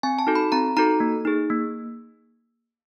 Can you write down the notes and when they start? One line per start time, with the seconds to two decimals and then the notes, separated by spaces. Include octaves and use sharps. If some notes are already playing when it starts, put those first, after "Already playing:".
0.03 C4 G#5
0.19 A5
0.27 D#4 F#4 A4
0.35 B5
0.52 C4 A#5
0.77 D#4 F#4 A4 A#5
1.00 A#3
1.25 D#4 G#4
1.50 A#3